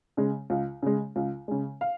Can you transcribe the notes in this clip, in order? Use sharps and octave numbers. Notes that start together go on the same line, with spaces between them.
C#3 G#3
C#2
C#3 G#3
C#2
C#3 G#3
F5